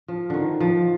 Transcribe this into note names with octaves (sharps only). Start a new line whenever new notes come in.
F3
D3 D#3
F3